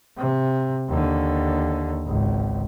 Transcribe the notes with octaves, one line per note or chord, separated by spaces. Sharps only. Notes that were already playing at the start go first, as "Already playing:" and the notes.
C3
D#2 D3
G#1 C#2